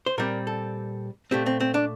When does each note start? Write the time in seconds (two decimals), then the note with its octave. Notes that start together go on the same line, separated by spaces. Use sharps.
0.06 C5
0.18 A#2 G3 C4 A#4
0.47 A4
1.31 A#2 A3 C4 G4
1.46 C4
1.60 C4
1.74 D4